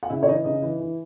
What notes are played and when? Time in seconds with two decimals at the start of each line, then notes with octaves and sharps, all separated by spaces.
0.03 F#5
0.09 C#3 E4 E5
0.23 C#5
0.27 E3 D#4 D#5
0.44 C#3 D#4 D#5
0.62 E3
0.80 E3